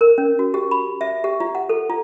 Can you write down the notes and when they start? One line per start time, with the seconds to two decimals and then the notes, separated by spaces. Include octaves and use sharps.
0.01 A#4
0.18 C#4
0.39 F#4
0.54 G4
0.71 B5
1.01 E5
1.24 G4
1.40 F4
1.55 F#5
1.69 A4
1.90 F4